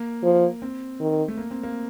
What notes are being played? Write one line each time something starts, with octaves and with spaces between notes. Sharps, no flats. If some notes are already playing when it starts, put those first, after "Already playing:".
Already playing: A#3
F3
C4
D#3
A3
A#3
C4
A#3